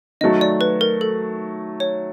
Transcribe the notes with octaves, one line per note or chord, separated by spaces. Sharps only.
D#3 F#3 A3 D#5
D5
B4
A#4
A4
C#5